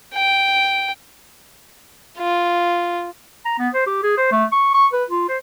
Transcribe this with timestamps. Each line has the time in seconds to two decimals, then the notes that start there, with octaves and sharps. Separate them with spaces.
0.14 G5
2.18 F4
3.45 A#5
3.59 B3
3.74 C5
3.87 G4
4.03 G#4
4.18 C5
4.32 A3
4.52 C#6
4.74 C#6
4.93 B4
5.10 F4
5.29 C5